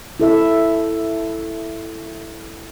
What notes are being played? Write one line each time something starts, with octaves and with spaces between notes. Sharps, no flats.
E4 A4 E5